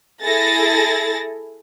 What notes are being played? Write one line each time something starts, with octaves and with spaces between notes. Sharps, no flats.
E4 G#4 A4 A6 A#6